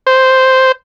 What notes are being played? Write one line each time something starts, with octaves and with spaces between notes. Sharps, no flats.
C5